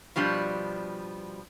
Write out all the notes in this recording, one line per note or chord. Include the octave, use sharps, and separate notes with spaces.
B2 F3 G3 D4